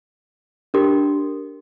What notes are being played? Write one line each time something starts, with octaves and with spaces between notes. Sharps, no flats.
D4 G4 A#4